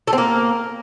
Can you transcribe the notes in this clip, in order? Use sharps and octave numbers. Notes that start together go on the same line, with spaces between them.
A3
C4
A#3